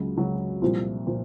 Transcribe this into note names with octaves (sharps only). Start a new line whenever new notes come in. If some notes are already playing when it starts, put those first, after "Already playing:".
Already playing: C#2 C#3 F#3
C#2 C#3 F#3
C2 A#2 F3
A#2 F3